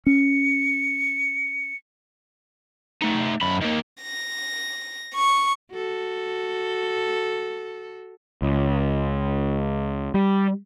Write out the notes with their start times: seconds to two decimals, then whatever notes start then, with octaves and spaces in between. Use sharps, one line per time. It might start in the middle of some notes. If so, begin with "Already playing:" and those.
0.07 C#4 C#7
3.02 A3 D#4
3.41 F#2 B5
3.62 D#3 A#3
4.02 A#6
5.15 C#6
5.72 F#4 A4
8.42 C#2
10.14 G3